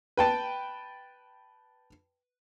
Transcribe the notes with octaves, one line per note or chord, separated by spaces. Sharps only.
B4 G5 A5